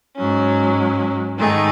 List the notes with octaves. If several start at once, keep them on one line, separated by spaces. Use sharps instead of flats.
G#2 F#3 C#4
G#2 D#3 A3 D#4 G#4